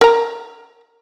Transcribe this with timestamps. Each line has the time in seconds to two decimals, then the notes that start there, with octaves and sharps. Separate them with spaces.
0.01 A#4 A#5